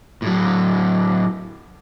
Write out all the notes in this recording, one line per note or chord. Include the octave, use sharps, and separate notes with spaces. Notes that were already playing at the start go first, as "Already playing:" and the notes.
A2 F#3